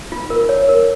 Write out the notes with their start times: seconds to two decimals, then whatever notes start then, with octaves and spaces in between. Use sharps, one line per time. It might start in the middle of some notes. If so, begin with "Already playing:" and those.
0.12 F4
0.30 A#4
0.49 C#5
0.69 A#4